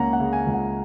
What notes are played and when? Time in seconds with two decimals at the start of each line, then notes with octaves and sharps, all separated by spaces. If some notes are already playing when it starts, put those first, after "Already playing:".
Already playing: C#2 A#3 C#4 F#5 A#5
0.13 F#5
0.20 C#3
0.33 G#5
0.47 C#2
0.54 F#5